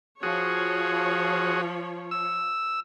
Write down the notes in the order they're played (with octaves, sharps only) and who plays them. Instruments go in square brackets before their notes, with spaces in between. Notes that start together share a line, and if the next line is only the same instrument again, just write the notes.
[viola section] F3 C#5 [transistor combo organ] F#4 G#4
[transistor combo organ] E6